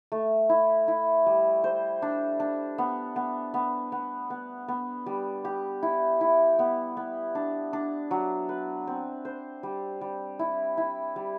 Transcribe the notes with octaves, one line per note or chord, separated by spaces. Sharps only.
A3
E4
E4
G3
C5
D4
D4
B3
B3
B3
B3
B3
B3
G3
G4
E4
E4
B3
B3
D4
D4
F#3
B4
C4
C5
G3
G3
E4
E4
G3